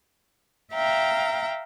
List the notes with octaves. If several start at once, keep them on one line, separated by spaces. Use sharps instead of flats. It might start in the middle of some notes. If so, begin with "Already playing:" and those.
E5 F5 G5 A#5